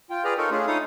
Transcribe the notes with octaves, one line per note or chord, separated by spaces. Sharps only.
F4 G5
G#4 B4 D5 A#5 F6
D#4 F4 A4 A#4 C#5
A3 C#4 D4 F4 G#4
D#4 E4 A4 C#5 F5 D#6